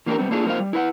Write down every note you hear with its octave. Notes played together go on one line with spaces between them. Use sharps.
E3 A#3 D4 F#4 G4 A#4
G3 G#3 B3 C4
A#3 D4 D#4 F4 G#4 A4
F3 A#3 C4 D4 D#4 F5
G3
E4 B4 F#5